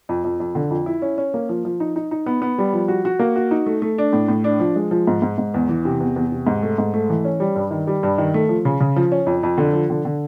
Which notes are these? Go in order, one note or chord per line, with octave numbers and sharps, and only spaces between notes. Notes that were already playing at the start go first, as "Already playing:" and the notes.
F2
F2
F2
D3
F2
E4
C#4
C#4
A#3
F3
F3
D#4
D#4
D#4
B3
B3
G3
F3
F#4
F#4
A#3
F#4
D#4
A3
A3
D4
A2
A2
D4
F3
G#3
F3
G#2
G#2
G#2
E2
E3
C3
E2
E2
C3
G#2
A3
G#2
A3
E3
C#4
G3
G2
D#3
G3
G2
D#3
A3
F3
C#3
C#3
F3
C#4
F2
F2
D3
F3
D3
D3